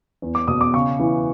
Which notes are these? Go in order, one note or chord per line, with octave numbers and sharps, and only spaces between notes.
E2
D6
B2 D#6
D6
C#3 C#6
E3